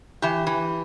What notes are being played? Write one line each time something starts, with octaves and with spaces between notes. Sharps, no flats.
E3 G4
E3